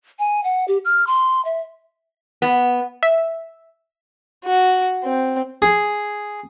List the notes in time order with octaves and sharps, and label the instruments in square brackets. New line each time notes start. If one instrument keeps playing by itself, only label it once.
[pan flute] G#5
F#5
G4
F6
C6
E5
[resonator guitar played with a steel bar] B3
[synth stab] E5
[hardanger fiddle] F#4
C4
[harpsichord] G#4